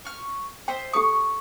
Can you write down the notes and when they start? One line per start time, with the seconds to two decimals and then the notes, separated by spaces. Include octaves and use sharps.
0.05 C#6 F6
0.68 C5 D#5 E5 G5
0.93 G4 A4 C#6 D#6